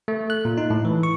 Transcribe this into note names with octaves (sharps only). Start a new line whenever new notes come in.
A3
F#6
A#2
D#4
A2
E3
C#6